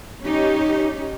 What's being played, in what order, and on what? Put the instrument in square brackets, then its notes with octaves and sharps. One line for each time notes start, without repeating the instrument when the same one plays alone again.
[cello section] C#4 D#4 G4